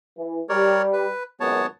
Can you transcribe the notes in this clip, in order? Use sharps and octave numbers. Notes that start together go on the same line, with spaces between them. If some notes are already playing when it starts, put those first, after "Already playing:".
E3
G3 A#4 C#5 D5
B4
G#1 C#2 F#2 B3 C#5 A5